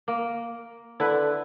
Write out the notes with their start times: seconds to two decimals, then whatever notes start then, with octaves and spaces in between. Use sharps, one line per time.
0.08 A#3
1.00 D3 E4 B4